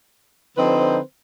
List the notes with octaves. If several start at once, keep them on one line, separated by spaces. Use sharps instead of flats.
D3 F3 C4 D#4 B4 C5